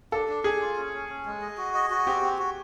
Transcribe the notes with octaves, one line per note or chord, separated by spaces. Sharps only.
D4 A4
D4
D4 G#4
F4
C#4
C#4
C#4
G#3
D#5
F#4
D#5
F#4
C4 G4
C4
F#4